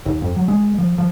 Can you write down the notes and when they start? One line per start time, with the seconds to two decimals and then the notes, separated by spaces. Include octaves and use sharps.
0.06 D#2
0.22 F2
0.36 F#3
0.48 G#3
0.78 F3
0.98 F3